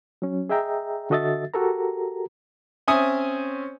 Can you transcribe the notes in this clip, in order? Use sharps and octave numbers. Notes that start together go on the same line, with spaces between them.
F#3 C#4
G#4 D#5 E5 G5 A#5
D3 F#4 A4 D#5 E5 A6
F#4 G4 A4 A#4 A#5
C4 C#4 E5 G#5 D#6